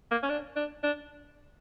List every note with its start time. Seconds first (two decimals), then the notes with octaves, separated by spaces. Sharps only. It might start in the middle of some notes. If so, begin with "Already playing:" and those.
0.11 A#3
0.23 C#4
0.29 D4
0.56 D4
0.83 D4